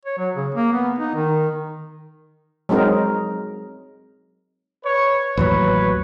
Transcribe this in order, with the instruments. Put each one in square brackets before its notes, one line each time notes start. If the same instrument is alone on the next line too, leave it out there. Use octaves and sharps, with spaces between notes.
[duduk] C#5
F#3
C#3
A#3
B3
D#4
D#3
[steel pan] F#3 G#3 C4 D#4 A#4
[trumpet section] B4 C#5
[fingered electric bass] A1 D#2 F#3 [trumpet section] B4 C#5